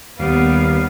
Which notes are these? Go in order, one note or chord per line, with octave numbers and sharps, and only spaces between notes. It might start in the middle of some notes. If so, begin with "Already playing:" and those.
D#2 G3 B3 F5